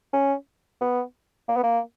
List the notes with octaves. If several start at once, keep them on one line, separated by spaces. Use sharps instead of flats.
C#4
B3
A#3
B3
A#3